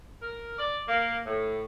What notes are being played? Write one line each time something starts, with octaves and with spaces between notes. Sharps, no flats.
A#4
D5
A#3
A2